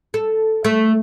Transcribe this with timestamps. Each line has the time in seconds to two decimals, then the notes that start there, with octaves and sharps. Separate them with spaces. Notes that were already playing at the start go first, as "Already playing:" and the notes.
0.14 A4
0.64 A3